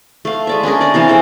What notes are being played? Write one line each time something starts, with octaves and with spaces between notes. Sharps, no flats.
A3 F5
G#3 D5 E5
C#4 D4 G#4 A#4
D5 D#5
C3 E3 F5 A5
G#4 A4 C5 G5